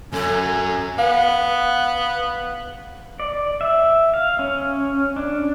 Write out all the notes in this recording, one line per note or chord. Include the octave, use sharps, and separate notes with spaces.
F#2 F#3 A4 G#5
B3 F5
D5
E5
F5
C#4
D4